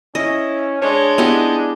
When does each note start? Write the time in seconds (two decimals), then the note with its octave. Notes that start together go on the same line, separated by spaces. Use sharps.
0.15 C#4 E4 D#5
0.82 G#3 D4 C#5
1.18 B3 D#4 E4 G4